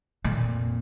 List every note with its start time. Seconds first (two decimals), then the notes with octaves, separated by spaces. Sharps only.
0.24 F2 A#2